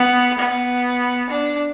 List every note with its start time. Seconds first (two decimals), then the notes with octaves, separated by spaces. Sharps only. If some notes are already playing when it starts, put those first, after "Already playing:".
Already playing: B3
0.39 B3
1.30 D4